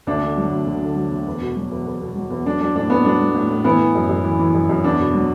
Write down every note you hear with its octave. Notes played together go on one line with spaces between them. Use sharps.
D2 D4
D3
F#3
D2
D2
D3
F#3
D2
E2
B2
F#3
E2
E2
B2
F#3
E2
F#3 D4
F#3 D4
A2 D4
A2 B3
F#3 D4
F#3
A2
A2
E3 B3 E4
E3
F#2
F#2
E3
E3
F#2
F#2
E2 D4
B2
F#3